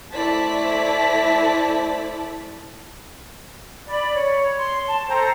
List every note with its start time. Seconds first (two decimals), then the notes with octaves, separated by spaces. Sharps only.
0.12 A3 E4 C5 D5 A5 B6
3.88 D5 B5
4.14 C#5
4.58 C6
4.87 A5
5.08 A4 C5 G5 A#5